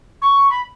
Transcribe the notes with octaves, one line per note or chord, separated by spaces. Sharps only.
C#6
B5